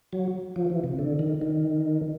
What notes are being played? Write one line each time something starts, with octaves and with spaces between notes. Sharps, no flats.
F#3
F3
E3
C3
D3
D#3
D#3